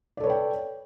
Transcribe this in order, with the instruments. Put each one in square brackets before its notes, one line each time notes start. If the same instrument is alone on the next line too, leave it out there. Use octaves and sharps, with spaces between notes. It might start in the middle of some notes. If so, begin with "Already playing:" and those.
[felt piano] D5
A4
C#5
B4
G5